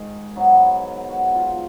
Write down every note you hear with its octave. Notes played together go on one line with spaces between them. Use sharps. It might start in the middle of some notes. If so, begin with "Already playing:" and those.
Already playing: G#2 D#3 G#3 G#4
G#2 F#3 B3
F#4
F4